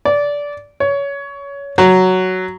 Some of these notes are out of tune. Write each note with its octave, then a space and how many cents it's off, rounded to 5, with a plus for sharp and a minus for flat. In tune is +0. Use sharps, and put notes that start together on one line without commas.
D5 -15
C#5 +20
F#3 +5